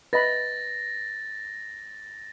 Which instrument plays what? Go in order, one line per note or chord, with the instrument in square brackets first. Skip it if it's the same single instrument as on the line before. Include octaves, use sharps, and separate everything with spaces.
[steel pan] B4 D#5 B5 [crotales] A6 A#6